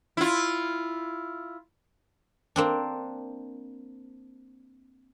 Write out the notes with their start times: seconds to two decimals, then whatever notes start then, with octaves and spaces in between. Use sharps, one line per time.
0.17 E4 F4
2.56 A#3 C4 D4